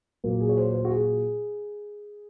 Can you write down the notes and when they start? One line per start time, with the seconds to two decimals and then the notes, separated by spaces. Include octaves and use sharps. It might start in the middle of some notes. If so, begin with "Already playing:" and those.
0.24 A#2 F#3 A#3
0.40 G#4
0.49 C#5
0.57 C5
0.74 C5
0.85 F#4
0.90 G#4